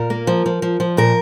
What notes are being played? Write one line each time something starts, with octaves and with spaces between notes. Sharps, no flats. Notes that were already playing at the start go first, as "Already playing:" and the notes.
Already playing: A#2 A#4
A#3
F3
F3
F3
F3
A#2 A#4